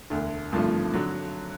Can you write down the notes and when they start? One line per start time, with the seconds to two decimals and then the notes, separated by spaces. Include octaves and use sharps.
0.10 E1 D2 D3
0.52 G#1 G2 D3 F3 A3
0.93 D3 F#3